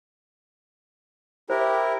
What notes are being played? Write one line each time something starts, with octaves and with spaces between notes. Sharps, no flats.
E4 G4 A#4 C5